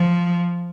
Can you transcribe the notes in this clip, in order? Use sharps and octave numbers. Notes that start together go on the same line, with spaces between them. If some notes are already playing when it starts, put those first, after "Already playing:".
Already playing: F3